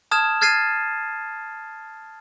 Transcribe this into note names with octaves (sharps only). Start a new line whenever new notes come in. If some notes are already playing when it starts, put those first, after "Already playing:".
A5 D#6 F6 G#6 E7
F6 G#6 A6 C7 D#7